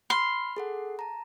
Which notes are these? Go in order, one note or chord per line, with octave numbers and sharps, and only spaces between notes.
B5 C6 F6
G#4 A4 F#5
A5 A#5